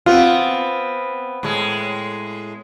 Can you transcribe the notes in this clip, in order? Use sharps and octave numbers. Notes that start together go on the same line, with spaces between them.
B3 C4 F4
A2 G#3